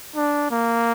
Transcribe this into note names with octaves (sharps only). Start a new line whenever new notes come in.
D4
A#3